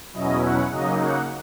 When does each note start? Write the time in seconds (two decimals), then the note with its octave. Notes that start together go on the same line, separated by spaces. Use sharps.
0.13 E2 B2 F#3 C#4 E4 D#5
0.42 F#5
0.70 C#3 F#3 A#3 D#4 D#5
0.99 F#5